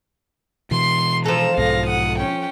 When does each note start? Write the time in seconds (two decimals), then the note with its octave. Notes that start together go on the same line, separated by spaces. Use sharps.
0.71 B2 E3 C6 C7
1.26 F3 A4 A#5 E7
1.58 B1 G#2 F5 A#6
1.87 F#5 D#6
2.19 C#4 G5